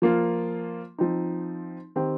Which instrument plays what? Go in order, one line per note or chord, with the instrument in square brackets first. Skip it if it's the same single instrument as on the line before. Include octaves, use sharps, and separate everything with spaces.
[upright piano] F3 A#3 F4
F3 C4 D#4
D#3 C4 G4